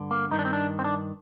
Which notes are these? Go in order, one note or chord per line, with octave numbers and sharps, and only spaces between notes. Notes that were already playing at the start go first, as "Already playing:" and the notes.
Already playing: G2 D3
A#3
G2 D#3 D#4
D4
C4
D4
C4
D4